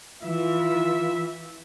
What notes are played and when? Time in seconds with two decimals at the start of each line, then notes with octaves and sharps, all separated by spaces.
0.23 E3 F4 E5